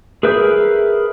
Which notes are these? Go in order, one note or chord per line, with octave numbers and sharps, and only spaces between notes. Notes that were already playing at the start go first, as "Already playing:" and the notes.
G#4 A#4 B4 E5 G6